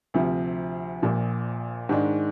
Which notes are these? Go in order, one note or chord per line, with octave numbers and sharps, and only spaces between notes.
D2 C3 F3
A#1 A#2 F3
G#2 D#3 G#3 D4